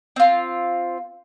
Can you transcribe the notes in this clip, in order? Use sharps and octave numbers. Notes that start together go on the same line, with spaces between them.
C4 F4